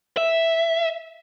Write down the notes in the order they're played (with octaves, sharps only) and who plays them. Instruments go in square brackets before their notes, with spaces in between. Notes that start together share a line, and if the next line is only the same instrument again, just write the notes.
[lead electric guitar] E5